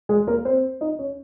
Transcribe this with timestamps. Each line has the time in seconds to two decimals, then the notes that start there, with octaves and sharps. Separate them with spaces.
0.09 G#3 G#4
0.27 A#3 A#4
0.45 C4 C5
0.81 D#4 D#5
0.99 C#4 C#5